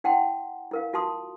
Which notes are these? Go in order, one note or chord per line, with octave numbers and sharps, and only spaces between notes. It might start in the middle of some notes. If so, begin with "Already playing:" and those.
E4 F#5 G5 A5 C6
E4 A#4 F5
F4 F#4 A5 C6 D#6